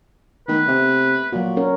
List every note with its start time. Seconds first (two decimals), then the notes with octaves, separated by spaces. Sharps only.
0.48 D#3 A3 B3 B4
0.68 C3
1.33 A#2 F#3 F#4
1.57 C#4 A#4 C#5